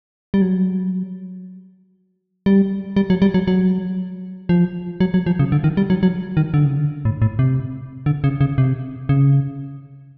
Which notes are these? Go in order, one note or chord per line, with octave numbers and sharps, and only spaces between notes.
G3
F#3
G3
G3
F#3
G3
F#3
F#3
F3
F#3
F#3
F3
C#3
D3
D#3
G3
F#3
F#3
D#3
D3
C#3
D3
A2
A2
C3
D3
C#3
C#3
C3
C#3